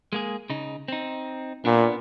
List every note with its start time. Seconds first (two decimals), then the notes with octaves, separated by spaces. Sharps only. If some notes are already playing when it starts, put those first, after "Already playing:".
0.13 G#3 A#3 G#4
0.50 C#3 D#4
0.88 C4 D#4
1.65 A#2 B3 D4